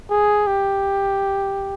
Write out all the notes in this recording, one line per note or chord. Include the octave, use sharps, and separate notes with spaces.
G#4
G4